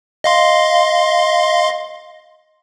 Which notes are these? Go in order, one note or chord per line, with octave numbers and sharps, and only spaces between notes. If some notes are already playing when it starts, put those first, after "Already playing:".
D#5 F5 C6